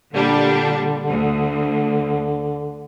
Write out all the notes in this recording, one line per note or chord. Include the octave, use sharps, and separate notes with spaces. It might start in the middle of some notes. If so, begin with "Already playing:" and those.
A#2 D3 G3 D4
D2